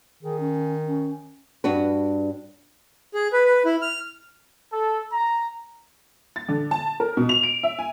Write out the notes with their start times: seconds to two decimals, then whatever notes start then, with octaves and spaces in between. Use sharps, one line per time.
0.23 D#3 G#4
0.40 C#4
0.86 C#4
1.64 G2 D4 F#4 B4
3.13 G#4
3.33 B4
3.45 B4
3.65 E4
3.82 F6
4.73 A4
5.13 A#5
6.36 A6
6.49 D3
6.71 A5
7.00 A#4
7.17 B2
7.29 F7
7.43 D7
7.63 E5
7.79 G#5